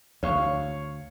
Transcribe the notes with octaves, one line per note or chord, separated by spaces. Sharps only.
D2 C#5 F5 C#6